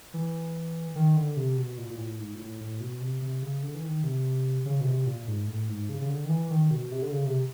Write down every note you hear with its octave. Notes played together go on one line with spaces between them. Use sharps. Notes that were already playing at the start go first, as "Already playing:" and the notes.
E3
D#3
D3
C3
B2
A#2
A#2
A2
G#2
A#2
A2
A2
B2
C3
C3
C#3
D3
E3
D#3
C3
C#3
B2
C3
A#2
G#2
A2
G#2
C#3
C#3
D3
D#3
E3
D#3
B2
C3
D3
C#3
C3